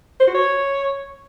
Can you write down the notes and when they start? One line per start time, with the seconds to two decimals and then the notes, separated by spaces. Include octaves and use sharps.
0.20 C5
0.27 F#4
0.35 C#5